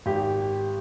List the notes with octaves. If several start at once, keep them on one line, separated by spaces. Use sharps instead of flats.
G#1 G4